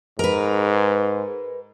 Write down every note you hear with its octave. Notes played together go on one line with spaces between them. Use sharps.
G#2 A#4 B4